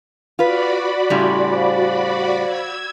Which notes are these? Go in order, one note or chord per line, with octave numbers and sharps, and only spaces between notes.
F4 F#4 B4 D5 B5
A2 C#3 G3 C6
C5 F5
E6 G#6